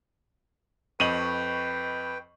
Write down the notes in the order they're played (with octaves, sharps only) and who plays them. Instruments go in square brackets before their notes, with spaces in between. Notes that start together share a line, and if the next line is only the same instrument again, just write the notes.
[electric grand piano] F2 [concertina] B4 G5 [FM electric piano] D#5 C#6 [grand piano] D#7 F#7